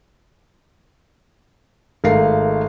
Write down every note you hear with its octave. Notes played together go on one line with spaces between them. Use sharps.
G#1 A3 A#4 F5 C7